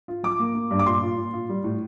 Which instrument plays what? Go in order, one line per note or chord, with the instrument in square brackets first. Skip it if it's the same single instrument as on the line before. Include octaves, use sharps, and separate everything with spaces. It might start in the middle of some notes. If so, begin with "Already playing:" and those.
[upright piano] F4
[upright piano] F3 [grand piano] D6
[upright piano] A#3
A#3
G2
[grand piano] D6
[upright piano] A#2 [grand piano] C6
[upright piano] F4
A#2
F4
G3
A2